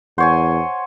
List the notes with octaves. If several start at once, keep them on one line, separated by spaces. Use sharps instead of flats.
E2 C5 C#5 F#5 G#5